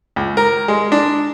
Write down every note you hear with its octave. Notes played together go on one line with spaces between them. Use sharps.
C#2
A#4
G#3
D4